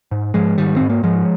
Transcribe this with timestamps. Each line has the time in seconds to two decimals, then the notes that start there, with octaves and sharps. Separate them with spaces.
0.11 G#2
0.34 G#2 F3 G#3
0.58 G#2 D#3 G3
0.76 G#2 C4
0.90 A#3
1.03 G#2 F3 G#3